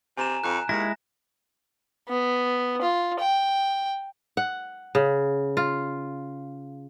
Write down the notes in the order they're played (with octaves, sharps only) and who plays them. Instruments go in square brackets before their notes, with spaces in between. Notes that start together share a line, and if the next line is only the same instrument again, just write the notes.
[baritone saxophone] C3 [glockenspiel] G#5 A#5 E7
[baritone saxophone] F2 [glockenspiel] F#6
[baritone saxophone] D#2 [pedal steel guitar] G#3 E4 [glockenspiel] A#6
[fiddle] B3
F4
G5
[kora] F#5
C#3
F4